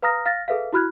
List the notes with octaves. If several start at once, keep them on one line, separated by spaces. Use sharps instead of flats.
B4 F5 A#5 D#6 F6 A#6
F5 F6 A6 A#6
G#4 A4 B4 E5 F5
E4 F#4 B5 F6 F#6 G#6